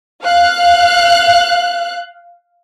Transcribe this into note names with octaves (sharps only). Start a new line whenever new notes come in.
F5 F#6